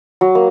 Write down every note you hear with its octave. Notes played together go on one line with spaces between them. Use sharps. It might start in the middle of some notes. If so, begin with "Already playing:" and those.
F#3
A#3